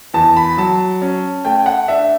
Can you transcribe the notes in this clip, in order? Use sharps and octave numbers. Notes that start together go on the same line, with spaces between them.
E2 A5
B5
F#3 A5
C#4
A3 G5
F#5
D4 E5